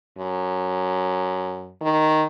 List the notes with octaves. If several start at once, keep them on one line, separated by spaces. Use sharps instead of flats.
F#2
D#3